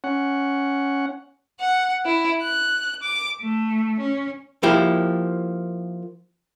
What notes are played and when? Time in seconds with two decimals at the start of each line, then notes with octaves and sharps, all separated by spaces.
0.04 C#4 F#5
1.60 F#5
2.05 E4
2.42 F#6
3.03 D6
3.41 A3
3.99 C#4
4.63 F3 A#3 E4 G4